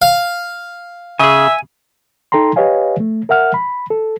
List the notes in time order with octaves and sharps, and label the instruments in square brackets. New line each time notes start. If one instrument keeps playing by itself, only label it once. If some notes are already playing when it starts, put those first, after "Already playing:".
[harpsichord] F5
[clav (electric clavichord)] C#3 G#4 [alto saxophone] E5 [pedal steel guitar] G#5
[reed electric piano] D#4 A4 G5 A#5 C6
G4 B4 C#5 D#5 F5 G#5
A3
A#4 E5 F#5 F6
B5
A4